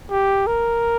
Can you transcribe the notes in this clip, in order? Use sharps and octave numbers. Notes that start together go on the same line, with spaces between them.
G4
A#4